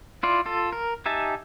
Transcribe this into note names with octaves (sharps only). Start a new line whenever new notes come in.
E4 F4 D5
F4 A4
A#4
D#4 G4 E5 G#5 A5